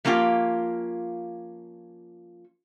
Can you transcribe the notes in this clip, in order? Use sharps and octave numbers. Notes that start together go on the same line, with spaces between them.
F3 A#3 C#4 F4 G4